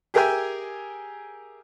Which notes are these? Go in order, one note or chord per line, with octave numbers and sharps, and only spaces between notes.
G4 G#4 A#4 E5 G5 G#5